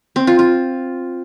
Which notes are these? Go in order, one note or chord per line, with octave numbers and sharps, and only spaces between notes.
C4
F4
F4